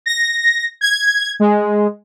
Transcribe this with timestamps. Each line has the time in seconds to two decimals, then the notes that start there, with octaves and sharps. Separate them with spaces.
0.06 A#6
0.81 G#6
1.40 G#3